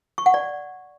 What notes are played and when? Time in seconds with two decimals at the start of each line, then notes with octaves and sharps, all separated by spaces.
0.18 C#6
0.26 F#5
0.34 D5